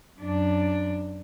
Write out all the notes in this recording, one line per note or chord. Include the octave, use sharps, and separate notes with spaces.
F#2 D4